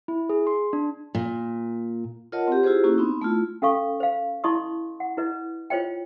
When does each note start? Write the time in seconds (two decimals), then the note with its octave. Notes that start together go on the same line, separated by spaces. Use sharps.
0.08 E4
0.29 G#4
0.47 C6
0.73 D4
1.15 A#2
2.32 F4 A#4 C#5 D#5 F#5 A5
2.48 C4 G4
2.63 E4 F4 G4 G#4 C5
2.84 A#3 C#4 E4 F#4
2.98 B3 C4 D#4
3.22 A3 E4 F4
3.62 C#4 A4 F5 C#6
4.00 C5 F5
4.44 E4 D#5 A5 C6 C#6 D#6
5.00 F#5
5.17 E4 B4 D#5
5.70 F4 C5 C#5 D#5 G5